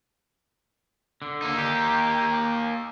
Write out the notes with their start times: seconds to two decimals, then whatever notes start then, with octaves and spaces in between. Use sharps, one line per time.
1.22 D3
1.42 A#3 D#4
1.58 G4